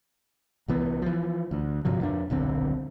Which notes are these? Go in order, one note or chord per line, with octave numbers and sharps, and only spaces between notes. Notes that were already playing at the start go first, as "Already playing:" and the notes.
C2 E3 B3
E3 F3
D2
G2 C3 F3 F#3
F2 D4
D#1 B1 D3 C4